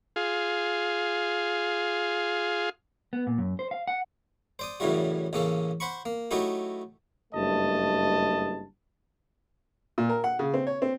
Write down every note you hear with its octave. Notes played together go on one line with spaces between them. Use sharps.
F4 G#4
B3
A#2
F#2
C5
F5
F#5
C5 D5 D#6
F#2 A2 C#3 E3 G3 F#4
A1 C#3 A#3 C#4 A4
C5 F#5 B5 C#6
A#3
F#3 A3 D#4 E4 F#4 G4
F#1 G2 A3 D#5 A5
A#2
A#4
F#5
C#3
C4
C#5
C4